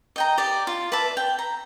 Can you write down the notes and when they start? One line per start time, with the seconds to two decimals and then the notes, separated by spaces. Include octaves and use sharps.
0.16 D#5 G5 A#5
0.37 G4 D5
0.67 F4
0.92 B4 D5 E5 A5
1.17 G5
1.39 A#5